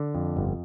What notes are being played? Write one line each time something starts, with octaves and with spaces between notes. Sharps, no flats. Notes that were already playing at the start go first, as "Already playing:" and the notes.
Already playing: D3
F2
G1